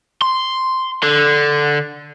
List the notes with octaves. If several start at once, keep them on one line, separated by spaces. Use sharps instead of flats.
C6
D3